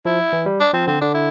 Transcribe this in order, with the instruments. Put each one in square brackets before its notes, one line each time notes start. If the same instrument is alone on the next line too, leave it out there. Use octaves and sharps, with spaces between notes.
[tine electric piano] F3 [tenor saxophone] E4
[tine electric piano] E3
G3
[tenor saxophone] D4
[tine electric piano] F3 [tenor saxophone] C4
[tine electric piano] D3 [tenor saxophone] C4
[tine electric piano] D3 [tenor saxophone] D4
[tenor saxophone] E4